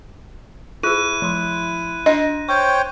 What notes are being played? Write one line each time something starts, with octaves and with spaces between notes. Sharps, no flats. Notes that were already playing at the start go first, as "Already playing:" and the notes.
E4 F4 G#4 F#6 D#7
F3 C6
D4 D#5 C6 A#6
C5 C#5 G5 C#6